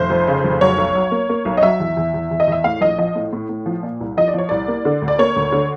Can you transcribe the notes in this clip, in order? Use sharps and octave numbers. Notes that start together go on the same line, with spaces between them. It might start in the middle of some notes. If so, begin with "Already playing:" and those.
Already playing: F1 C5
F2
C#3
F1
F#3 C#5
B1
F#3
A#3
A#3
B1
D#5
F#3 E5
E2
E2
E2
E2
D#5
E2 E5
A2 F5
A#1 D#5
F3 D#5
A2
A2
A2
F3
A#2
C2
F3 D#5
D5
F3 C#5
C2 D5
A#3
D3
D2
D5
A#3 C#5
D2
D3